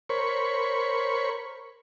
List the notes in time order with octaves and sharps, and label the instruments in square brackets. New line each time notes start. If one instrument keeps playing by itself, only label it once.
[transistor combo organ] A#4 C5 C#5 B5 C#6